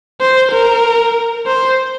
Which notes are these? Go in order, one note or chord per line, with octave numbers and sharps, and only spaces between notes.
C5
A#4
C5